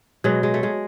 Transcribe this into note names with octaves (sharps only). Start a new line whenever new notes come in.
B2 F#3 G#3
G#3
A3
G#3